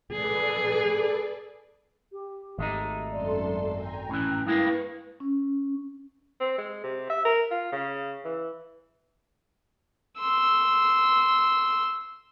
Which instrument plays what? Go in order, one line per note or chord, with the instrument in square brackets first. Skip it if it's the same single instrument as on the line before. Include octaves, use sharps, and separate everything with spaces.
[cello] G#4 [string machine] A4 B4 D5
[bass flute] G4
[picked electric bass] G#1 [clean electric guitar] G#3 A3 D#4
[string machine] F#2 A4 C6 [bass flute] D5
[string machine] G5 G#5 A#5
[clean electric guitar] A2 E3 [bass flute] C#4
[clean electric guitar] G2 G#3 A#3 [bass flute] E4 [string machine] B4 C#6
[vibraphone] C#4
[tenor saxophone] C4
G#3
C3
E5
A#4
F4
C#3
E3
[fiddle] C6 E6